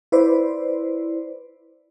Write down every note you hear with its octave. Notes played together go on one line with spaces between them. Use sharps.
E4 B4 C5 D5